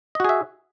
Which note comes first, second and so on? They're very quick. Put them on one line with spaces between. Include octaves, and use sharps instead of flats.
D#5 F#4 G#4 E5